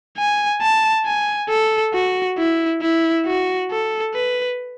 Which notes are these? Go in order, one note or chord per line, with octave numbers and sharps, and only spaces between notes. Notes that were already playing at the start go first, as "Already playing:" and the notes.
G#5
A5
G#5
A4
F#4
E4
E4
F#4
A4
B4